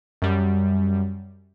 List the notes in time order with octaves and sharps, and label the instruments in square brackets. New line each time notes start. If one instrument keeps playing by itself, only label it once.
[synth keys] F#2 G3